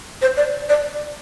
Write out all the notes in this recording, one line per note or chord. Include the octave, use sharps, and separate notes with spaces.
C5
D5
D5